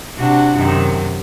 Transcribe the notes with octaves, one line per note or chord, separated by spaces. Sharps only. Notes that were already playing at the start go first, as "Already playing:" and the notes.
C3 D4 F#4
F#2 C3 D#3